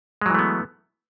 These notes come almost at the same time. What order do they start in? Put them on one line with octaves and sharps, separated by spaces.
G#3 F#3 E3 A3 B3